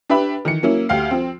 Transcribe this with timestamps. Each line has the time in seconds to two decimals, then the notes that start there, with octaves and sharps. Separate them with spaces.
0.09 D4 G4 B4 E5 B5
0.45 D#3 E3 C#7
0.63 F#3 A#3 C#4 E4
0.89 D2 G4 F5 C7
1.11 F3 C4